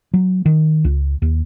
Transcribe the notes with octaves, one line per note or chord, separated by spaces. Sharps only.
F#3
D#3
C#2
D#2